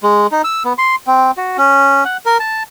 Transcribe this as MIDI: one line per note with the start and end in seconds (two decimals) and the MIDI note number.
0.03 0.27 56
0.32 0.42 63
0.44 0.63 88
0.65 0.73 59
0.78 0.96 84
1.07 1.31 60
1.37 1.57 66
1.57 2.04 61
2.05 2.17 78
2.26 2.38 70
2.40 2.63 81